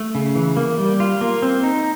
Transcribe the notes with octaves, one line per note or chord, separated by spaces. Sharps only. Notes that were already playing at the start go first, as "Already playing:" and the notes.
Already playing: A3
C#3
E3
A#3
G3
F4
A#3
C4
D#4